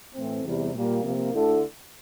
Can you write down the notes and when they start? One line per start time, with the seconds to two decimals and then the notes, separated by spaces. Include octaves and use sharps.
0.15 A2 E3 A3 C4
0.44 E2 C3 G3
0.74 A#2 G3 A#3
1.03 C3 F3 A#3
1.33 D2 D3 A3 E4 A4